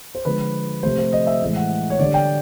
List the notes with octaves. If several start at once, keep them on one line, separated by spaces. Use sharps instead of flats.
C5
D3 F3 G#3 B4
C3 F3 A3 C5
C5
D#5
E5
A2 E3 G#3
F#5
C#5
D3 G3 D5
G5